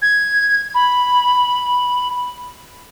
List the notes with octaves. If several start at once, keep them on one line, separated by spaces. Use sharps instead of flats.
G#6
B5